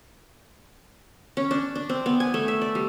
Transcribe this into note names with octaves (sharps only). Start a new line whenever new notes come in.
C#4
D4
D4
C4
B3
G#5
A3
E5
D5
G3